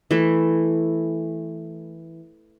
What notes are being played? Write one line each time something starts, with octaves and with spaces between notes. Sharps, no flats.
E3 A3